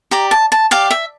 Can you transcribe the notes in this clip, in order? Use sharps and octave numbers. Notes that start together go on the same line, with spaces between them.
G4 D5 A#5
A5
A5
G4 D5 F5
E5